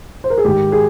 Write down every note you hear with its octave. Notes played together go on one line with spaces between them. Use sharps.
C5
A#4
G#4
G#2 D#3 G#3 G4
G#4